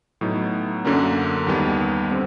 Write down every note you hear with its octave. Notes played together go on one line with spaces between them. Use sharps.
A2 F#3 B3 D#4
F#2 D3 F#3 A#3 C#4
D#2 D#3 G3 B3
D3 G3 C4